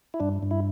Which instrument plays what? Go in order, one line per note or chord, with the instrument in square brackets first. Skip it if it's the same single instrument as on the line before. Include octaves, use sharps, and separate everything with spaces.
[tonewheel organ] E4
G2 D4
G2
E4